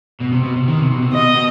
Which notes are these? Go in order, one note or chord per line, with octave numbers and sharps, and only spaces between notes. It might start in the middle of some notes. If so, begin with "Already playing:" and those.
B2
C3
B2
C3
D#3
C3
B2
C3
B2 D#5
B2